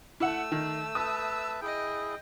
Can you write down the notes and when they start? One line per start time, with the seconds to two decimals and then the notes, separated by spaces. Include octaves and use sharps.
0.20 A3 E4 F#5 E6
0.52 D#3
0.95 B4 E5 A5 D#6
1.62 E4 G#4 D#5 G5